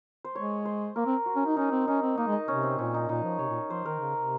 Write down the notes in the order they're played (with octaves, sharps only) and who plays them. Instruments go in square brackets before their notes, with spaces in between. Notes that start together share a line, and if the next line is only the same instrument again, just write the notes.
[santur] C5
[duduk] G#3 [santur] C#5
[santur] C5
[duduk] A#3 [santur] A#4
[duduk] C4
[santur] F#4
[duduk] C#4
D#4
[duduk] C#4 [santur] D#4
[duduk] C4
[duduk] C#4 [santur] D#4
[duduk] C4
[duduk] A#3 [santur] D#4
[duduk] G#3
[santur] D#4
[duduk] C3 [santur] C#4
[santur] C4
[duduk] A#2 [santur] C#4
[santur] D#4
[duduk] A#2 [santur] D#4
[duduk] F3
[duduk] C3 [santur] C#5
[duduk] A#2
[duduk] F3 [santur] C5
[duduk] D#3 [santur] A#4
[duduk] C#3
C3